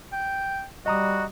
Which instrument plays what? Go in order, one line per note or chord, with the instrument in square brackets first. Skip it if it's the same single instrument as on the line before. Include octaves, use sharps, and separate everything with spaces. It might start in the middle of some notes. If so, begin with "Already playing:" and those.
[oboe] G5
[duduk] G3 [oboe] F#4 [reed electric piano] D#5 A#5 D#6